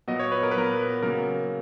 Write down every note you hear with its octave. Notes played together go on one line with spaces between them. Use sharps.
A#2 F#3 B3 D#5
C#5
B4
A#4
B4
A#2 F#3 B3 A#4
C#3 F#3 A#3 A#4